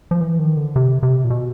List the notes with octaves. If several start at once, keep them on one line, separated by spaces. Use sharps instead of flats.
F3
E3
D#3
D3
C3
C3
A#2
B2